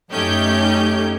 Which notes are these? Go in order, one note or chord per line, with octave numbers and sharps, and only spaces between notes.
F#2 A3 C#4 D#4 G4 G6